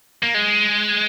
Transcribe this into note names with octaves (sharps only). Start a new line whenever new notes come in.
A#3
G#3